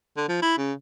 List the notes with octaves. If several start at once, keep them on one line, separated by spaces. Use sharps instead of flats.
D3
F3
E4
C#3